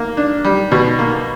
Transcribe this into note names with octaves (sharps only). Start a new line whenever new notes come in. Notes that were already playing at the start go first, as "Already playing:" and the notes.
Already playing: A#3
D4
G3
B2
A#3